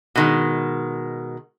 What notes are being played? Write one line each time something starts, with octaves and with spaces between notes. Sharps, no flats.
B2 D#3 G#3